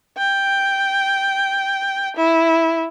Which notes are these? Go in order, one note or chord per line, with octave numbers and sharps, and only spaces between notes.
G5
E4